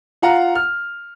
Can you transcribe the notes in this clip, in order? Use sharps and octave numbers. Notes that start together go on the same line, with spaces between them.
F4 F5 F#5 A#5
F6